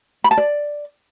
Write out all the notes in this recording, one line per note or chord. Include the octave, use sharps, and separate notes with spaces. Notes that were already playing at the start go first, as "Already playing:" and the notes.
B5
A5
D5